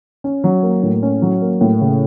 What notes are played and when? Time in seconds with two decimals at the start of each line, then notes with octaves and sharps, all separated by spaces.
0.24 C#4
0.44 F#3
0.63 A#3
0.83 A2
1.03 C#4
1.22 F#3
1.42 A#3
1.61 A2
1.81 C#3